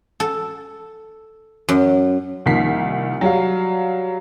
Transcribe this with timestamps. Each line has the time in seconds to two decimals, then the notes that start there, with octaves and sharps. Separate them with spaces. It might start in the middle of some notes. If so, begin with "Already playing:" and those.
0.20 A4
1.69 F#2
2.46 C2 D#3 F3 A#3 B6 C7
3.21 F#3 G3 F5